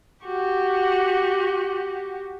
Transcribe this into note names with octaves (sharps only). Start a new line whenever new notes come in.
F#4 G4